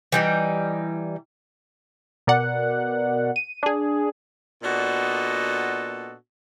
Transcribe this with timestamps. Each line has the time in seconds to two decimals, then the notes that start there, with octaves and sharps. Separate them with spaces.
0.12 E3 G3 D#4
2.27 B2 A#4 D5 F#5
3.36 D#7
3.63 D4 G#4
4.63 A#2 B3 D4 F#4 A4 D#5